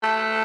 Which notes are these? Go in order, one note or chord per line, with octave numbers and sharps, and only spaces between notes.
A3